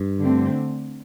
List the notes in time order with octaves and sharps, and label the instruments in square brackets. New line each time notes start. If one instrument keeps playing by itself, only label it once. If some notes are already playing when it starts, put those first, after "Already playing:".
Already playing: [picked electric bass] G2
[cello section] D3 A3 C4